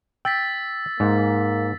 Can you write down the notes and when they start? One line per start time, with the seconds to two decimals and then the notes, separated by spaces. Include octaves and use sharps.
0.25 G5 E6 A6 B6
1.00 G#2 A#3